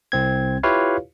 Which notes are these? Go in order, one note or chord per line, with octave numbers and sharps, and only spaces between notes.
C2 C4 G#6
E4 F4 G4 B4 C#5 F5